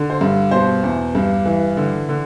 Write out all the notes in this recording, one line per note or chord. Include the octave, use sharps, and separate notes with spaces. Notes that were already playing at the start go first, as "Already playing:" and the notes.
Already playing: D3
C5
G2
B2 C5
E2
G2
E3
D3
D3